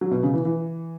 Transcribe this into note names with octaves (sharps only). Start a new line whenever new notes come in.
F#3
B2
C#3
E3
E3